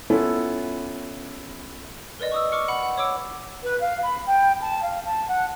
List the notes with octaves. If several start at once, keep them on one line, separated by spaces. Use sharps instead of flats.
B3 C#4 E4 F4 A4
A#4 B4 D5 D#5
C#6 D#6 E6
C#6 D6 F6 C#7
F#5 B5 C#7 F#7
F#5
C#5 D6 E6 D7
B4
F5
B5
G5
A5
F5
A5
F#5